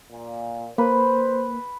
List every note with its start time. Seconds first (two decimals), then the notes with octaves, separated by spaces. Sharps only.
0.11 A#2
0.78 A#3 B4 C5